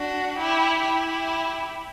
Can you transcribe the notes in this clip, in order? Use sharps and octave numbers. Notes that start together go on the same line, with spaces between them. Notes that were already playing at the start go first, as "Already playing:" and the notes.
Already playing: D4 F#4
E4 G4
E4 G4